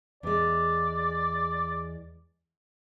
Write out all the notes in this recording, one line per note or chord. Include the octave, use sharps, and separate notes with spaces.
E2 G#3 D5